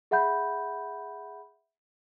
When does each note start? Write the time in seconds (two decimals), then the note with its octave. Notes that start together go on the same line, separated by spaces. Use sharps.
0.11 G#4 E5 F#5 B5 G6